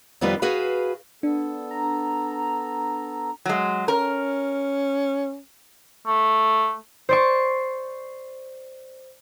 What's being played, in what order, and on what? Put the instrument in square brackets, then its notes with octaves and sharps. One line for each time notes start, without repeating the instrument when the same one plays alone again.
[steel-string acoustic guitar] F2 D#3 G3 B3 F4 B4
F#4 G#4 B4 F5
[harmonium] B3 A4 [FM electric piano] D4
[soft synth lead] A#5
[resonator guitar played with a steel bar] F#3 G#3
[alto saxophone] C#4 [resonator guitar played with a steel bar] A#4
[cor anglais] A3
[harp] C5 D5 C#6